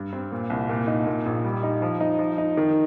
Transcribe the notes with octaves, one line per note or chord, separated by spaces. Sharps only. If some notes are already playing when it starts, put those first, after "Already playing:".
Already playing: G2
C4
A#2
C2
A#2
D#4
A#2
A#1
G3
D#4
F3
D#4
F3
D#4
D#3